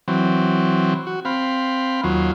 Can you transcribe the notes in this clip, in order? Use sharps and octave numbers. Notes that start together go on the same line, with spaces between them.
E3 F#3 C4
F#4
C4 F5 B5
D#2 F#3 F4